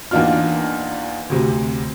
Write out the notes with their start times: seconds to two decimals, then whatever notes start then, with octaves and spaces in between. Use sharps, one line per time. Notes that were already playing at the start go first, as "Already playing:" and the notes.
0.11 E2 A#3 D4 D#4 F4 F6
1.30 D2 C3